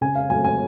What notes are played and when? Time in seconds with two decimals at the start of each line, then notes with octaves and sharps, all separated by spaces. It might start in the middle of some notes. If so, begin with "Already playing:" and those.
0.01 C#3 G#5
0.15 F5
0.30 F#3 A3 G#5
0.44 G#5